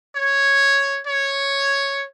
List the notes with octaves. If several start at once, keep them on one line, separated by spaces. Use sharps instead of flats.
C#5
C#5